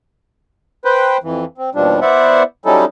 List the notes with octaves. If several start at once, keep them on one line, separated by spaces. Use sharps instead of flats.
B4 C5 G5
F2 E3
C4
D#2 B2 F3 G3 D4
B3 E4 C5 D5 E5 F#5
F#3 G3 C#4 D#4 E4 A4